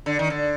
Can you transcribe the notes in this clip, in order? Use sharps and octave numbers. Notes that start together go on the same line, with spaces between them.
D3
D#3
D3